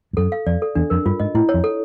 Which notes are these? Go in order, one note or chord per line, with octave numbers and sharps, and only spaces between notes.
G2
F#2 A4
F5
F2 D5
A4
E2 D4
F2 A#4
G2 F4
G#2 D#5
A2 E4
C#5
F2
A4